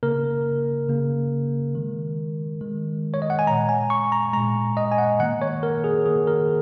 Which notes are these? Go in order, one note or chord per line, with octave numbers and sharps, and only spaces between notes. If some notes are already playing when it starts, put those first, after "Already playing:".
C#3 A#3 A#4
C#3 A#3
D#3 G#3
D#3 G#3
C#5
D#5
F#5
G#5
A#2 G#3 A#5
G#5
C#6
A#5
A#2 G#3 A#5
D#5
G#5
F#5
D#3 A#3 F#5
C#5
A#4
G#4
D#3 A#3 G#4
A#4